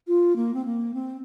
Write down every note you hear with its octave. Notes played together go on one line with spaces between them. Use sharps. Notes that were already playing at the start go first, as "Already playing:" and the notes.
F4
A#3
C4
A#3
C4